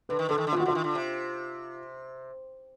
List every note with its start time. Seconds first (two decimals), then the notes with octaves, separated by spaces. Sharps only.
0.09 D3 B4
0.19 D#3
0.29 D3 A4
0.38 D#3
0.47 D3
0.53 F4
0.56 D#3
0.60 F#4
0.66 D3 F4
0.75 D#3
0.84 D3
0.95 C3